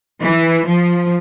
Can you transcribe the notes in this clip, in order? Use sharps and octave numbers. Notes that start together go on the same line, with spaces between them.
E3
F3